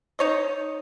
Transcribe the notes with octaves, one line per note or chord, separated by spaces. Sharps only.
D#4 C#5 D#5